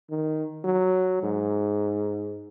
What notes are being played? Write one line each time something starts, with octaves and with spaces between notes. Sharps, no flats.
D#3
F#3
G#2